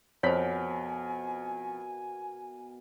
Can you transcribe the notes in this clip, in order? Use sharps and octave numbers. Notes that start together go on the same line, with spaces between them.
F2 B2 A#4 C5 C#5 G#5 B6